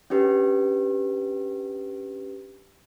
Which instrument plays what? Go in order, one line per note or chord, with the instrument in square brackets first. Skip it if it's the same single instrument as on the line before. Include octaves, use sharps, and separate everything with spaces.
[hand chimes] C#4 D4 G4 B4